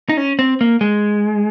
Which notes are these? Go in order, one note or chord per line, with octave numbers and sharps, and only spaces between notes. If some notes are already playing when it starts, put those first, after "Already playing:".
D#4
C#4
C4
A#3
G#3